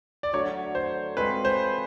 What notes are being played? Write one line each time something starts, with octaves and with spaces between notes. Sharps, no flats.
D5
D3 F#3 A3 C#5
C5
G#3 C4 F4 B4
C5